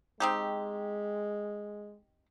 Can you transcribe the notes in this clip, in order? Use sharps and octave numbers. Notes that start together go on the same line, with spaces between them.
G#3 C4 D#4 G4